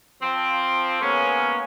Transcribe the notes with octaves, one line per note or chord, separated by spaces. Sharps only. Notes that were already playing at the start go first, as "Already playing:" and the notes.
F3 C4
G#3 A#3 B3 C#4